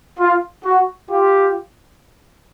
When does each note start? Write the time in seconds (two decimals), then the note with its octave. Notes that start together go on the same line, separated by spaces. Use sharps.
0.18 F4
0.64 F#4
1.09 F4 G4